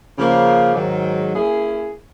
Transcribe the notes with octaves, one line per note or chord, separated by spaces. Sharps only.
C#3 F3 A#3
G#2 D#3 F#3
A#3 C#4 E4 G#4